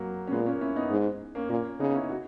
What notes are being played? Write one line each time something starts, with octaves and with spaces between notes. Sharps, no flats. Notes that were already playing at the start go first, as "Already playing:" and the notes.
Already playing: F#3 A#3
C#4
A#2 G#3 B3
A#3 C#4
C#4 E4
B3 D#4
G#2
A#3 C#4
A#2 A#3 C#4
C#3 B3 D#4
C#4 E4
D#4 F#4